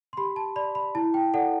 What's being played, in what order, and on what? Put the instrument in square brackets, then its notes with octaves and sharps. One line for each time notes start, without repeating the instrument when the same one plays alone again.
[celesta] C6
G4 B5
A5
D5 B5
B5
E4 A5
G5
A4 D5 F#5